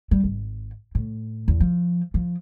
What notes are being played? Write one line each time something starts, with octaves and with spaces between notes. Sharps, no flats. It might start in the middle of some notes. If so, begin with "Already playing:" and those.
G3
G#1
A2
E2
F3
F3